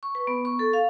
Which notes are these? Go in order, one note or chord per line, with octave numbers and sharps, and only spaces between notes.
C#6
B4
B3
C#6
A4
F5